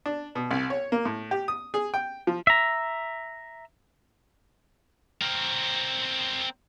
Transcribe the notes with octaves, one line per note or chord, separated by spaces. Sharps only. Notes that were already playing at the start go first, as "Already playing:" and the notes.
D4
B2
C2
C#5
A#3
A2
G4
D#6
G#4
G5
F3
E5 A#5
C4 A#4